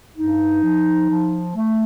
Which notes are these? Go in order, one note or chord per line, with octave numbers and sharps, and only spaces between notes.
G2 D#4
F3
F3
A3